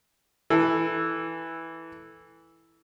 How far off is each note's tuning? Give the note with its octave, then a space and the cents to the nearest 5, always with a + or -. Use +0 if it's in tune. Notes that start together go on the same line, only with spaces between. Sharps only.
E3 +0 A4 +0